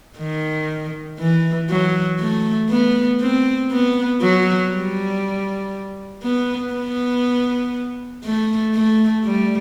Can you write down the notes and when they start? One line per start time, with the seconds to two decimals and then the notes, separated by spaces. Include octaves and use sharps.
0.18 D#3
1.19 E3
1.70 F#3
2.20 A3
2.70 B3
3.21 C4
3.71 B3
4.22 F#3
4.71 G3
6.23 B3
6.73 B3
8.24 A3
8.74 A3
9.25 G3